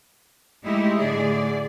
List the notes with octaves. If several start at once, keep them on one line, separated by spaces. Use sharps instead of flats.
G#3 A3 D#4 E4 G4
A2 D3 G#4 D5